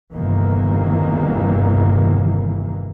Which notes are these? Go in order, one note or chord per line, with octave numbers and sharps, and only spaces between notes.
G1 E2 C3 D#3 E3 A#3